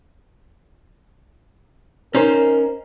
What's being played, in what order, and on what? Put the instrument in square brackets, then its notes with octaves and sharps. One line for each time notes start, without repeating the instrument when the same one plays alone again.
[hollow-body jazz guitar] C#4 D#4 C5 [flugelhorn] A#4